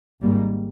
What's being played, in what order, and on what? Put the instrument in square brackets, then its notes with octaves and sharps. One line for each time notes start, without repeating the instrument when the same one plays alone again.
[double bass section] G#1 G#2 G3 A#3